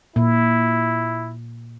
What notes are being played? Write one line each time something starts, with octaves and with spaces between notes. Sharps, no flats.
A#2 E4